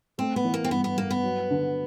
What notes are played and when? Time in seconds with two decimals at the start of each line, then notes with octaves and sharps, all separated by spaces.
0.18 A3 C4
0.36 B3
0.44 E3
0.54 A#3
0.64 C4
0.71 G2 B3
0.84 B3
0.97 G2 A#3
1.11 B3
1.24 F#3
1.50 D3